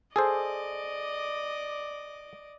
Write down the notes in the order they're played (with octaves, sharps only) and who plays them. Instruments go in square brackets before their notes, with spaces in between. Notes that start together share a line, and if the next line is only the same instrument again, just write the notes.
[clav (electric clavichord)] G#4 A4 C5 [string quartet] D5 D#5 D6